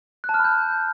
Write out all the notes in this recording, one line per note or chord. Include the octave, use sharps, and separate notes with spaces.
F#6
A5
F6
B5
G6